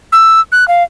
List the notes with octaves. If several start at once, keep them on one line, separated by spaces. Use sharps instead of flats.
E6
F#6
F5